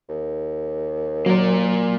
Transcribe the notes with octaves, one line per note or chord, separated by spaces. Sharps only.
D#2
F#3 A#3 D5